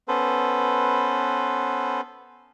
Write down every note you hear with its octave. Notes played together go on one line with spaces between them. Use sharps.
B3 C#4 A4 B4 C5